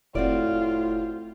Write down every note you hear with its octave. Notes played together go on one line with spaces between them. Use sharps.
F1 A2 C4 F4 F#4 D5